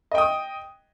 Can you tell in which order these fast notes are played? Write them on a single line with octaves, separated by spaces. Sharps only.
D#5 G5 D#6